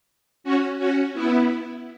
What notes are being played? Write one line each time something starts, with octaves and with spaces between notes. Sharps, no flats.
C#4 F#4
C#4 F#4
B3 E4